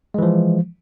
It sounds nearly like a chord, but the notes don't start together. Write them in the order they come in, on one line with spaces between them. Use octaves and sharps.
G#3 E3 F3